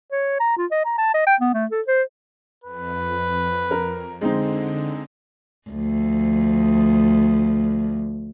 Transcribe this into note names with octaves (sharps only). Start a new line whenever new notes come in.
C#5
A#5
F4
D#5
A#5
A5
D#5
G5
B3
A3
A4
C5
F2 B4
A#4
D3 G#3 C4 D#4
D2 F3